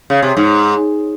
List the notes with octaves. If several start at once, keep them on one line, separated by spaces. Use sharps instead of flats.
C#3
C3
G#2